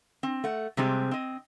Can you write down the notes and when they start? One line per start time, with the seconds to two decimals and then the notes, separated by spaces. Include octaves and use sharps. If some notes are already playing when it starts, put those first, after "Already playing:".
0.23 C4
0.44 A3 F#5
0.77 C3 G3 G#3 C4 G4
1.11 C4 D#5